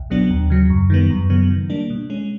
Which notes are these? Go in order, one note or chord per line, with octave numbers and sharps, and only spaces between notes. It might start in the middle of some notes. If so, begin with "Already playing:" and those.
Already playing: C2
B2 F#3 B3 D4
D#2
C#3 F#3
F#2
D#3 G3 B3
F#2
C#3 F#3 B3
D#3
G3 A#3 D4
B2
G#3 C#4